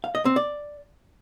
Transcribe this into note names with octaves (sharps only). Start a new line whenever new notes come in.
F5
D#5
C4
D5